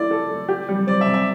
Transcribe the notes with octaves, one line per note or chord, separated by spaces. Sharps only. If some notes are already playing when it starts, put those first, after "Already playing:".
Already playing: A3 E4 D5
A4
A3
G4
G3
C4 D5
E5
C3
E5